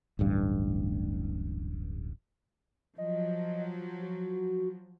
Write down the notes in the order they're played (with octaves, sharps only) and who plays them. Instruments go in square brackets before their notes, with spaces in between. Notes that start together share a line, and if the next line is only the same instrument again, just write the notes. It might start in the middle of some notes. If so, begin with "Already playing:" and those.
[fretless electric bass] D1 A1 G2
[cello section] F3 F#3 [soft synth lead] D#5
[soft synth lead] F#4